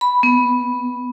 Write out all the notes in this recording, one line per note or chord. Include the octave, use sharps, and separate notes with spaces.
B5
B3